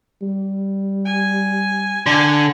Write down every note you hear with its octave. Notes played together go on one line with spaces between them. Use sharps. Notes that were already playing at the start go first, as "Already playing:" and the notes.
G3
G#5
D3 G#5